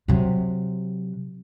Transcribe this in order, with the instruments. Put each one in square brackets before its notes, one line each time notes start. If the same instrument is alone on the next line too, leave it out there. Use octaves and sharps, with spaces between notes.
[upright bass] C3 F#3